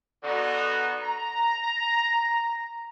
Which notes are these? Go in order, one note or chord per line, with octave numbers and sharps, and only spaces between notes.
D3 B3 D#4 F#4
A#5